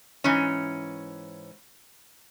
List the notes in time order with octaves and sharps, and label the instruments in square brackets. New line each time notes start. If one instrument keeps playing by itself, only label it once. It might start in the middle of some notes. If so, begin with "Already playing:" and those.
[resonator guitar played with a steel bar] G#2 E3 C#4